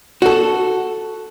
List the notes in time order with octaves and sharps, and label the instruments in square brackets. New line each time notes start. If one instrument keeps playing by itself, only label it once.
[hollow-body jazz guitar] F#4 A4